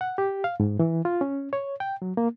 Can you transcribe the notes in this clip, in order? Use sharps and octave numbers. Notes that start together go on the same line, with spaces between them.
F#5
G4
F5
G#2
E3
F4
C#4
C#5
G5
F#3
A#3